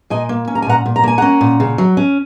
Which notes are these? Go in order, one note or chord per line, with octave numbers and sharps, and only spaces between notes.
A#2 D#5 G#5
A#3
C#4
A#5
G#5
A#2 F#5 A#5
A#2
A#5
A#3 G#5
C#4 F#5 A#5
A#2
C#3
F#3
C#4